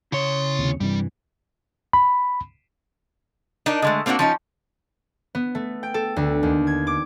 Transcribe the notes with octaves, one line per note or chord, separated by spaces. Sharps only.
C#3 E4 C#5 C6
D#2 C3
G2 C3 E3 G3
B5
D4 D#4 A#4
D3 G#3 A3
A#3 C4 D4 F4 F#4
F3 C#4 D#4
B3
A3
G5
A4
D2
D#2
G#6
D6